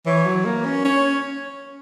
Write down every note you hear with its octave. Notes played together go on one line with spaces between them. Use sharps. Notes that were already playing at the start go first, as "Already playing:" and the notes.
E3 C#5
F#3
A#3
C#4
C#4 C#5